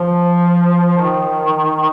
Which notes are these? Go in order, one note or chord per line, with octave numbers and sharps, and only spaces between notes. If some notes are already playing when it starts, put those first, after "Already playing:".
Already playing: F3
D#3